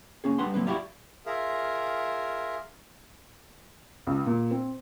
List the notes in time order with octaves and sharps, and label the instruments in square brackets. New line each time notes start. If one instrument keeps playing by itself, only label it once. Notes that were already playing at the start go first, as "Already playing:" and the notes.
[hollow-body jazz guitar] A#3 C#4 G#4
G3 D4 B4 F#5 C6
F#3 A#3 C4 B4
E4 F#4 G4 D5 F5
[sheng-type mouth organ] F4 G#4 A#4 E5 F5
[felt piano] C#2
A#2
C4